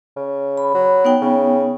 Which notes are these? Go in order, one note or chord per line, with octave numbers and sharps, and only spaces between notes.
C#3
B5
F#3
B3 D#4 G5
C#3